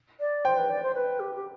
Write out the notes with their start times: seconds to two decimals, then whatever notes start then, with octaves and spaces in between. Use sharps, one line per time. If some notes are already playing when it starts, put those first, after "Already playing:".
0.20 D5
0.45 C5 G5
0.57 B4
0.69 D5
0.83 C5
0.94 B4
1.19 G4
1.35 G4